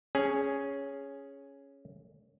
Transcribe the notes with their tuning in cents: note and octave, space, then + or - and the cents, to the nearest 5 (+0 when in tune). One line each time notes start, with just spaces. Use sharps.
C#4 +0 G#4 +0